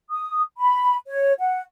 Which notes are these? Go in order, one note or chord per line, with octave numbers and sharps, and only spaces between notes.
D#6
B5
C#5
F#5